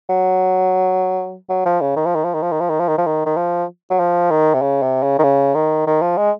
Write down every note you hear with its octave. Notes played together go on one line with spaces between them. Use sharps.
F#3
F#3
F3
C#3
D#3
F3
D#3
F3
D#3
F3
D#3
F3
D#3
F3
D#3
F3
D#3
D#3
F3
F#3
F3
D#3
C3
C#3
C3
C#3
D#3
C#3
D#3
D#3
F3
G#3